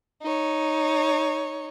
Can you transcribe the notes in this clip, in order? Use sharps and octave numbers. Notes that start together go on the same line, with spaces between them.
D#4 C#5